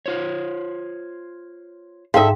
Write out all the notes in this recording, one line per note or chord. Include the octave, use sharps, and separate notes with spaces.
F4 C5 C#5
G#2 D3 D#4 A4 E5 F5 G5